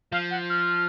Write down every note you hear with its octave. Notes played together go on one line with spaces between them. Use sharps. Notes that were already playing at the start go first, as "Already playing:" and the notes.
F3 F5
F#5
F6